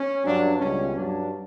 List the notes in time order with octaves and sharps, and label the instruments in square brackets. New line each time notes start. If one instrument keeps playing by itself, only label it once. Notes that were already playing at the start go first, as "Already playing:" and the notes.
Already playing: [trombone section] C#4
G2 F#3 D4
C#2 B2 G3 C#4
G2 F#3 D4